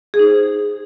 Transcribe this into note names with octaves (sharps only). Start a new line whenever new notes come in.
G#4
D#4
C5